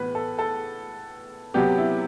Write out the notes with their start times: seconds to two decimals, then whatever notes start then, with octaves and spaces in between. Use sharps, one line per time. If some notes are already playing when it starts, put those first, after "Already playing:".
Already playing: A2 E3 B3 B4
0.15 A4
0.39 A4
1.54 C3 F#3 B3 G4
1.78 E4